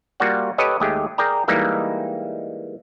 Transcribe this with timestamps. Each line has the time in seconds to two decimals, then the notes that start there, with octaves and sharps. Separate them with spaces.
0.20 G3 A#3 F4 F#4 D5 F#5
0.58 G4 A4 B4 C#5 D#5
0.80 D#2 G#3 A3 G4 G#4
1.18 G#4 A#4 D5 G5 A#5
1.48 E3 G3 G#3 A#3 D#4